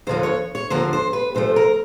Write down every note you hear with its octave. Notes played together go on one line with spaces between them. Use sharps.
D#2 D3 F3 A#3 C5
C#5
C#5
D#2 D3 F3 A#3 C5
C5
B4
E2 C3 F3 A3 C5
A#4